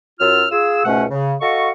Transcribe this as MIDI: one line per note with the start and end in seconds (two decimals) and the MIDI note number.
0.20 0.46 42
0.20 0.46 54
0.20 0.46 65
0.20 0.46 88
0.20 0.46 89
0.52 0.84 65
0.52 0.84 68
0.52 0.84 88
0.85 1.04 37
0.85 1.04 44
0.85 1.04 47
0.85 1.04 57
0.85 1.04 61
0.85 1.04 78
1.11 1.35 49
1.41 1.71 66
1.41 1.71 69
1.41 1.71 75
1.41 1.71 77
1.41 1.71 85